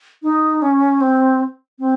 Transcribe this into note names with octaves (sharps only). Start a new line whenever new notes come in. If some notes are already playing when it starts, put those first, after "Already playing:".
D#4
C#4
C4
C4